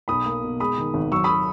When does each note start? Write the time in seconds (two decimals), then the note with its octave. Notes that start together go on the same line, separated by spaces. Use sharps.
0.08 B1 B5 D#6
0.26 A#3
0.43 B2
0.60 G#3 B5 D#6
0.78 D#3
0.94 G#1
1.12 F#3 C#6 E6
1.24 B5 D#6
1.30 F#3